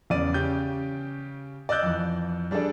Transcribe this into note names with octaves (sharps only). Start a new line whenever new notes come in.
E2 C#3 D5 D#7
C#3 G4 G6
D5 D#5 E6 F#6 G6 A6
F2 E3
G3 D4 G#4 A4 D5